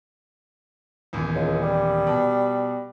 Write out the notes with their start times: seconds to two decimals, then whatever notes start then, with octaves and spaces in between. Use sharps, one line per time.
1.13 D#1 E2
1.34 C#2
1.62 G3
2.07 B2